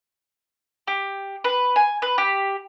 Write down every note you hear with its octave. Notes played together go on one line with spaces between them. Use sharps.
G4
B4
G#5
B4
G4